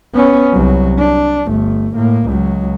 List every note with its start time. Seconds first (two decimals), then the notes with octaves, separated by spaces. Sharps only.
0.15 B3 C#4
0.53 C2 F#3
0.98 D4
1.47 G1 A3
1.95 A2 A#3
2.26 C#2 F#3